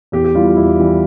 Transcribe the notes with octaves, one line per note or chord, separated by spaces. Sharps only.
E2 G4
G4
E3 G3 F4
F4
E2 E4
E3 G3